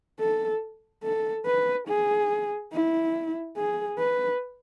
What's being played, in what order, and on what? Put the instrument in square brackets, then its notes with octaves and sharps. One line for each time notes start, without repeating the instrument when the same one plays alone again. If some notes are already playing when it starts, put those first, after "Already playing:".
[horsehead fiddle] A4
A4
B4
G#4
E4
G#4
B4